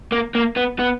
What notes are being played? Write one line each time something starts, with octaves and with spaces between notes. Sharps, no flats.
A#3
A#3
B3
B3